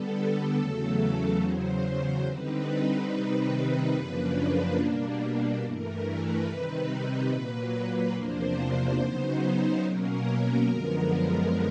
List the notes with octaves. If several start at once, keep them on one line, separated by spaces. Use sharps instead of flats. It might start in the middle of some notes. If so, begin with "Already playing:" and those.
Already playing: D3 G3 B3 A4
E2 C#3 F#3 A3
E2 C#3 F#3 C5
C5
D3 G3 C4 D#4 B4
C3 D#3 G3 C4 D#4
F#2 C#3 F3 A#3 D4
B2 G3 A#3 D4
G2 E3 A3 A#4
B4
C3 D#3 G3 C4 D#4
A#2 F#3 A#3
E2 C3 F3 A#3 D4 C5
C#3 F#3 B3 D#4
B2 F#3 A#3 C#4 A#4
F#2 D3 F3 G#3 B3